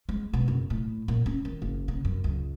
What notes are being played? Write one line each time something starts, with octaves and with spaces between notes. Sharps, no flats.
G#3
B2
F#1
A2
A#2
C#4
D#3
F#1
C#3
F#2
C#2